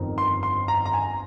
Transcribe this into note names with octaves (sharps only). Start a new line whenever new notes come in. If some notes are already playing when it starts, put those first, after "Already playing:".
Already playing: G1 F2 D#3
C6
C6
A#5
A#5
G#5